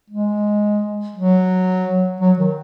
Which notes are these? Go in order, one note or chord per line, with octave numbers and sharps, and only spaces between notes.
G#3
F#3
F#3
D#3